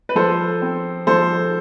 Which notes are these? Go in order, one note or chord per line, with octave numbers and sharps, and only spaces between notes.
B4
F3 A4 C5
C4
F3 A4 C5